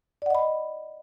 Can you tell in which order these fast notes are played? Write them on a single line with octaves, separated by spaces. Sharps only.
D5 F#5 D#5 B5